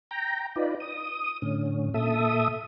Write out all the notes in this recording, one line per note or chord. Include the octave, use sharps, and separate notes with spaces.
G5 A#5
D#4 F4 B4 D5
D#6
A2 D3 C#4
A#2 A4 E5 D#6